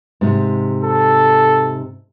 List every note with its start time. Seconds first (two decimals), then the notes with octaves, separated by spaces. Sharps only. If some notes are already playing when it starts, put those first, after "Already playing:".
0.21 G#2 C3
0.84 A4